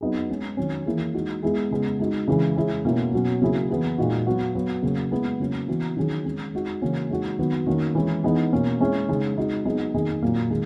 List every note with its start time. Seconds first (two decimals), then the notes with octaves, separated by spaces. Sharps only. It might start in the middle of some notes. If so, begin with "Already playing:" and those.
0.01 F#3 B3 D#4 G#4
0.29 G#3 C#4 G#4
0.57 D#3 F#3 C#4
0.86 E3 A#3 E4 G#4
1.14 G#3 D#4 F#4
1.43 G#3 B3 E4 G#4
1.71 C#3 G#3 B3
1.99 G#3 D#4 F#4
2.28 C#3 E3 G#3
2.56 G#3 C#4 E4 G#4
2.85 B2 A#3 C#4 E4
3.13 B2 F#3 C#4
3.41 C#3 F#3 A#3 E4 G#4
3.70 E3 B3 E4 G#4
3.98 A#2 G#3 D#4 F#4
4.27 F#3 B3 F#4
4.55 F#3 B3 F#4
4.83 C#3 F#3 A#3
5.11 G#3 B3 E4
5.40 C#3 F#3 A#3 C#4
5.68 E3 B3 F#4
5.97 D#3 F#3 C#4 G#4
6.25 G#3 C#4 G#4
6.53 G#3 D#4 F#4
6.82 C#3 E3 A#3 C#4 F#4
7.10 G#3 D#4 F#4
7.39 D#3 F#3 B3 F#4
7.67 D#3 A#3 C#4 F#4
7.95 E3 G#3 C#4
8.24 E3 B3 D#4 G#4
8.53 B2 A#3 C#4
8.80 G#3 C#4 E4
9.09 C#3 G#3 D#4
9.37 G#3 D#4 F#4
9.65 F#3 B3 D#4 G#4
9.94 D#3 A#3 D#4 G#4
10.22 A#2 F#3 A#3
10.50 D#3 G#3